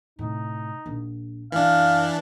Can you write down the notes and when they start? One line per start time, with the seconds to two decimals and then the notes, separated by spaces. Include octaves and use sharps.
0.19 A2 C3 D#4
0.86 A#1
1.52 F#2 E3 D4 F4 F5